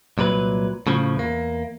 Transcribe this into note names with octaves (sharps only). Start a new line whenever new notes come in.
C2 A#2 F#3 B4
A2 C#3 F3
E2 A#3